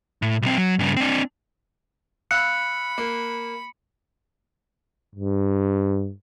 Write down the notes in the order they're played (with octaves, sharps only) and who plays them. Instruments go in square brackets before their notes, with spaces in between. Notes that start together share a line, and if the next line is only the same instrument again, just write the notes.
[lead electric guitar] A2
B1 C4
F#3
G2 C#3
C4 D4
[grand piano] F5 E6 [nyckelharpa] B5 [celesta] F#6 [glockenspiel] C#7
[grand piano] A#3
[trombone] G2